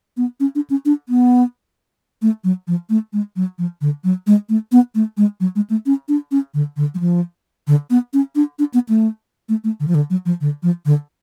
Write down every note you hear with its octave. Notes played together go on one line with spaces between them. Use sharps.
B3
C#4
D4
C#4
D4
B3
A3
F#3
F3
A3
G#3
F#3
F3
D3
F#3
G#3
A3
B3
A3
G#3
F#3
G#3
A3
C#4
D4
C#4
D3
D3
F#3
F3
D3
B3
C#4
D4
D4
B3
A3
A3
A3
D3
F3
D3
F#3
F3
D3
F3
D3